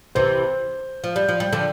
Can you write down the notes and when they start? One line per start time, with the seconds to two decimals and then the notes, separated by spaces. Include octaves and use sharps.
0.15 C3 E3 C5
1.04 F3
1.16 G3
1.29 F3
1.40 G3
1.53 D3 F3